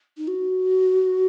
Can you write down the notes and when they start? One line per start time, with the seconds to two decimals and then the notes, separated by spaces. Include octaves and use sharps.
0.17 D#4
0.28 F#4